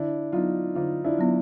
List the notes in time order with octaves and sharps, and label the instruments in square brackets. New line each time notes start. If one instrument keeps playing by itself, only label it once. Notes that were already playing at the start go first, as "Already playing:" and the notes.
Already playing: [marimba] D3 [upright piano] D4 E4
[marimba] F#3 B3 [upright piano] D#4 F4
[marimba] D3 [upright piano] D#4 F4
[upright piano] D4 E4
[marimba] F#3 B3